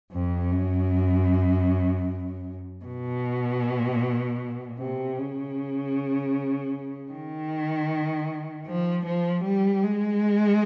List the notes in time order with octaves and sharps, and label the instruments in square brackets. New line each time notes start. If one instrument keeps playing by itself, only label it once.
[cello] F2
F#2
B2
C3
C#3
D#3
F3
F3
G3
G#3